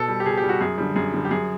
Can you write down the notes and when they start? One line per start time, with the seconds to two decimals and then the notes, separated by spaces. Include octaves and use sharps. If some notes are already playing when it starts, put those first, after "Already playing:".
Already playing: B2 A4
0.08 G3
0.20 G4
0.26 B2 G#4
0.37 G4
0.43 G3
0.49 F#4
0.61 F#2 G#4
0.78 D3 G3
0.96 F#2 G#4
1.14 D3 G3
1.25 G4
1.31 F#2 G#4